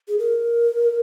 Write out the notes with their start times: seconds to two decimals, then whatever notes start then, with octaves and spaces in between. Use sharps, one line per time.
0.08 G#4
0.19 A#4